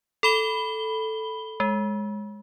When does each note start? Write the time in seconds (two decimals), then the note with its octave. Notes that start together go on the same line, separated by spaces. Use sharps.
0.23 A4 B5 G7
1.60 G#3